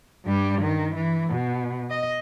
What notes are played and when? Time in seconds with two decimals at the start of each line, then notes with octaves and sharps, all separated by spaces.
0.25 G2 G3
0.62 D#3
0.96 E3
1.31 B2
1.90 D#5